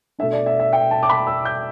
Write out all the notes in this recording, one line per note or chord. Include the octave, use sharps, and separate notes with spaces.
B2 A3 D4 E5
D5
E5
E5
G5
A5
D6
B5
E6
G6